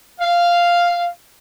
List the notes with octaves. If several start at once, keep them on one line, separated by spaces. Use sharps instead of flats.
F5